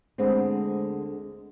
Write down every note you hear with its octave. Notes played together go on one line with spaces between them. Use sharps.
D2 D3 G#3 B3 C4